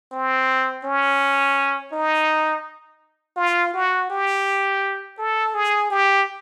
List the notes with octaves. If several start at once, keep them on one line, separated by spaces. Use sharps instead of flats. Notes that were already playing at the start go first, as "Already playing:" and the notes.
C4
C#4
D#4
F4
F#4
G4
A4
G#4
G4